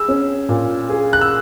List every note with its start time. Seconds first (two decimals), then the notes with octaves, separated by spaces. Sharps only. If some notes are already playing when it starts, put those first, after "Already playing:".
Already playing: G#4 E6
0.08 C#4
0.49 A#2
0.89 G#4
1.13 F#6
1.21 E6